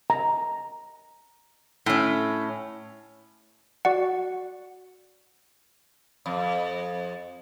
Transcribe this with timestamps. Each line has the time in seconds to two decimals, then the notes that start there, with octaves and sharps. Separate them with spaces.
0.10 A#5
1.86 A2 C#4
3.85 F#4 D5 F#5
6.26 F2